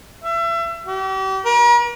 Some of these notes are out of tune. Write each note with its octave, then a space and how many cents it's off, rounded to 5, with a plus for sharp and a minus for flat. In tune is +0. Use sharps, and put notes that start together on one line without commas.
E5 +30
G4 -40
A#4 +45